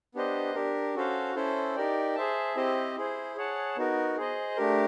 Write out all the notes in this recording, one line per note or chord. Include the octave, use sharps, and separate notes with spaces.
B3 D4 G4 C5 D#5
D4 G4 A#4
C#4 F#4 A4 C5 F5
C#4 E4 A4 C5
D#4 G4 A#4 D5 G5
G#4 C5 E5 A5
C4 E4 G4 C5 D#5
E4 G#4 C5
G#4 C#5 F#5 A5
B3 D#4 F#4 A#4
G#4 C5 D#5
A3 D4 G4 A#4